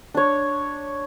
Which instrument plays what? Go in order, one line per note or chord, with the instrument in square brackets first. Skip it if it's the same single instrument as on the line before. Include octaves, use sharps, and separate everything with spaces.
[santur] D4 C#5